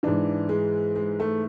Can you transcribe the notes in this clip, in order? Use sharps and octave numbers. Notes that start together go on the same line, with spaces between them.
G#2 E3 D4
G#3
G#3
A3